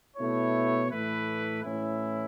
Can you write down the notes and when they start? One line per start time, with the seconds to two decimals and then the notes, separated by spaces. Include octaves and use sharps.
0.17 B2 A3 E4 C#5
0.90 A2 E3 A3 E4 B4
1.62 A2 E3 C#4 E4